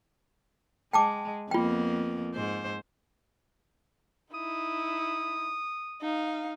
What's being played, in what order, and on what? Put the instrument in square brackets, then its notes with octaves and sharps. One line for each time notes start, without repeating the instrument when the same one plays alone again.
[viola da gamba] G#3 [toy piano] G5 A5 D6
[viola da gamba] F2 A#3 B3 [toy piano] F4 G5
[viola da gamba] G#2 C5
[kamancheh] D#4 E4 [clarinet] D#6
[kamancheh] D#4 F5